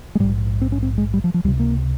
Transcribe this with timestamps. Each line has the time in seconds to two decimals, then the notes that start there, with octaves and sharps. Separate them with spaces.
0.15 G#3
0.20 A#1 G#2 G3
0.61 C4
0.72 C#4
0.83 C4
0.98 G#3
1.14 G3
1.24 F3
1.34 F3
1.44 C#2 G3
1.48 C3
1.59 A#3